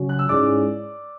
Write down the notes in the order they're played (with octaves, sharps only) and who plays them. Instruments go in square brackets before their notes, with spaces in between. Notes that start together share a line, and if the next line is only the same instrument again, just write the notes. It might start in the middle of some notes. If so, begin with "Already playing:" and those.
Already playing: [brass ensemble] C#3 F#3 C#4 F#4
[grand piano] F#6
E6
[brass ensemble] G#2 G#3 C#4 E4 G#4 [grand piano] D5 D6